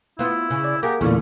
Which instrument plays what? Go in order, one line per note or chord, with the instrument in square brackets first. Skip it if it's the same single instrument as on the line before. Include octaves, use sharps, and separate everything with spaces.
[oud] B3 F4 [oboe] E4
[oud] C#3
[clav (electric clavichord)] D5
[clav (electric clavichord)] A#3 G#4 F#5 [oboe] G4 [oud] A#4
[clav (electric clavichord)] E2 A#2 [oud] D3 A3 [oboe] C#4